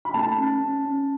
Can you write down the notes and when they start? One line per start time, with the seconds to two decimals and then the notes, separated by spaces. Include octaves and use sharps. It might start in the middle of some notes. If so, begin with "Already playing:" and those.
0.05 B5
0.14 A3 A5
0.37 C#4
0.60 C#4
0.85 C#4